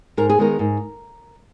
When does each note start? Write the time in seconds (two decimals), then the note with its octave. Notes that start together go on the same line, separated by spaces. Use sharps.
0.17 G#2 A#4
0.30 G#4
0.38 D#3 G#3 B3 A#4
0.59 G#2